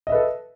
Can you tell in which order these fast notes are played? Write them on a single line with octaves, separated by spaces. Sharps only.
D#5 E5 B4 A4